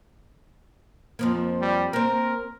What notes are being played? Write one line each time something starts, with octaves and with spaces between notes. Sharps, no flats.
F2 F3 A#3
G3
A#3 C4 A#4